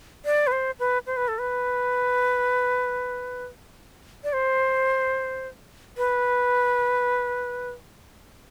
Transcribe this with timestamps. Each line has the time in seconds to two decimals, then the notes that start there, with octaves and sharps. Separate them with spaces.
0.25 D5
0.47 B4
0.52 C5
0.79 B4
1.06 C5
1.17 B4
1.28 A4
1.38 B4
4.24 D5
4.33 C5
5.97 B4